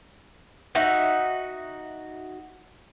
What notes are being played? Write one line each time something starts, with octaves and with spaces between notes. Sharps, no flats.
D#4 F#4 E5